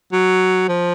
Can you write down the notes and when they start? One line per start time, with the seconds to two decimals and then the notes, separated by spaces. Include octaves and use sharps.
0.12 F#3
0.68 F3